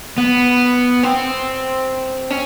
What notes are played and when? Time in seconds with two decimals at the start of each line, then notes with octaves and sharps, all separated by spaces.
0.18 B3
1.03 C4
2.30 C#4